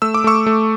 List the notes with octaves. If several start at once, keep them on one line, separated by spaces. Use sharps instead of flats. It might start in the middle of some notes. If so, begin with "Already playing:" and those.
A3 E6
D6
A3 C#6 E6
A3